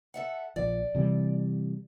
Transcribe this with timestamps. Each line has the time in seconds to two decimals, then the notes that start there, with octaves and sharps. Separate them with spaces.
0.14 A4 E5 F#5
0.56 A#1 F3 D5
0.95 C3 E3 G3